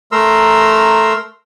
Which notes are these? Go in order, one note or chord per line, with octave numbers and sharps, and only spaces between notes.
A3 A#4 A#5 C6 E6